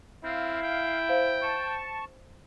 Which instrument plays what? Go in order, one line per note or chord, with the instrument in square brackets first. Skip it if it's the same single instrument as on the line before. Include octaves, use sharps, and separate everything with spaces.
[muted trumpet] C4 [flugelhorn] E4 [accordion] F5
[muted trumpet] G5
[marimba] C5 F5
[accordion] A5 C#6